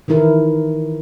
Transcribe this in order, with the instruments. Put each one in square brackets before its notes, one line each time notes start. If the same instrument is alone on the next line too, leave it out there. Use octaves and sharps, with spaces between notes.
[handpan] D#3 E3 E4 A#4